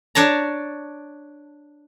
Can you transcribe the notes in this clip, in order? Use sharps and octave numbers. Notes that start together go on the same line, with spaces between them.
D4 C#5 A5 A#5